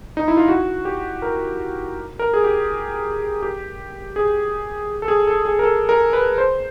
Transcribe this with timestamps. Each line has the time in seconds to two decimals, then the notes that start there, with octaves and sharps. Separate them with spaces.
0.17 D#4
0.28 E4
0.37 F4
0.48 F#4
0.85 G4
1.22 A#4
2.19 A#4
2.34 G#4
2.44 G4
3.42 G4
4.16 G#4
5.02 A4
5.08 G#4
5.27 A4
5.45 G#4
5.59 A#4
5.63 A4
5.89 A#4
6.13 B4
6.38 C5